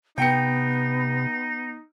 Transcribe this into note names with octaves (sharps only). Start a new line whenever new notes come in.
C3 B3 D#4 G5 C#7